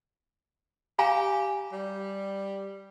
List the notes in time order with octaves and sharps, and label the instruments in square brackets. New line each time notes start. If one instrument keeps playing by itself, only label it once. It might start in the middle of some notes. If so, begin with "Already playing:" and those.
[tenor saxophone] G4 [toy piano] F5 G#5 A#5
[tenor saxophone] G3